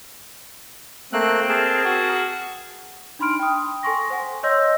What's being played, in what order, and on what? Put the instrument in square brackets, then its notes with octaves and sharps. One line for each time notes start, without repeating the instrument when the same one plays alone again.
[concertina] A3 A#3 F#6 [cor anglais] C4
[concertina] G#4 A#4 A5
[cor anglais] F#4
[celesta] D4 D#4 B5 C6 F6 D7
G5 D#6
A4 G#5 C6 C#6 A#6
C5 F#5 G#5
C#5 D#5 C6 E6 G6 A#6